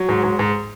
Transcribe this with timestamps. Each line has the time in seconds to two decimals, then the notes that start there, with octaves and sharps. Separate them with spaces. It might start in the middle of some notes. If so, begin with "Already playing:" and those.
Already playing: F#3
0.09 G#2
0.24 G#2
0.39 G#2